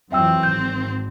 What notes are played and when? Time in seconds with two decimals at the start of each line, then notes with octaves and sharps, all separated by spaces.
0.12 F2 E3 F#3 C4 E5 G5 E6
0.43 G#1 G6